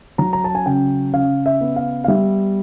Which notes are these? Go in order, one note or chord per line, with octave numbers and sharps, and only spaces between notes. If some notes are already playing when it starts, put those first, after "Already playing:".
F#3 A#5
A#5
A5
G#5
C#3 G5
C#3 F5
E5
B3
F5
F5
G3 E5